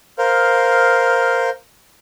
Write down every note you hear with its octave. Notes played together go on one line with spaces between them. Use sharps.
A#4 C5 F5